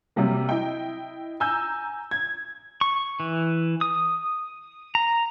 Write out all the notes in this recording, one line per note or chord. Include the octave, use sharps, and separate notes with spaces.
C3 F#3 G3 A#3
E4 D#5 G5
G#5 A#5 E6 G6
G#6
C#6
E3
D#6
A#5